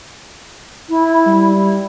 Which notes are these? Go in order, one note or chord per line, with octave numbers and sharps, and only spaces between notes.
E4
G3